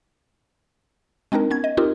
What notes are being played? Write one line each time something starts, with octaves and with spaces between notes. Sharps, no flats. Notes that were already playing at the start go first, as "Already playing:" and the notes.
G#3 C4 D4 D#4 A#4
B3 C#4 G#6
D#5
C4 D#4 F4 G4 A#4